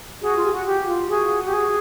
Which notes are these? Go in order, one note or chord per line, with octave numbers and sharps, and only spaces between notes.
F#4 G#4
F4
G4
F#4
F#4 G4
F#4
F4
F#4 G#4
G4
G#4